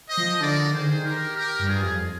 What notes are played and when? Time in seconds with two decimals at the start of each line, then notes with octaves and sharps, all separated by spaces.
0.09 C5 D#5
0.18 F3
0.41 D3 A#4 D5
0.72 D#3 G#4 C5
0.80 D3
0.88 D#3
1.04 G4 A#4
1.35 G4 A#4
1.60 G2
1.67 F4 G#4
1.83 F2